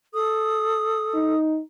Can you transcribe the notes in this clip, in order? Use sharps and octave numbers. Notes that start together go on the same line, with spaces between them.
A4 D#6
D#4